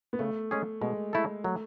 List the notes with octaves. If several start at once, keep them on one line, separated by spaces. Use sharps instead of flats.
B3
C#3 A3
G#3 C#4 G#4
B2 G#3
A3 E4 A4
F#3 A3